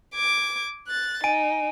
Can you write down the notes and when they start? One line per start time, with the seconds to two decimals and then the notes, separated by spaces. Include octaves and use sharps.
0.16 D6 G#6
0.88 F#6 A6
1.24 D#4 G#5 D7 D#7